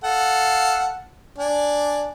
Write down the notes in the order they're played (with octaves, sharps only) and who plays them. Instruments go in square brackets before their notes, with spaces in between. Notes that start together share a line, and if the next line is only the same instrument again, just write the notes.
[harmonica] A4 F5 F#5
D4 D5 G#5